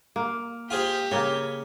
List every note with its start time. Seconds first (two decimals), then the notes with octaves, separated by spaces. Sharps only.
0.16 A#3
0.71 F4 G4 G#4 C5
1.11 C#3 A#3 C#4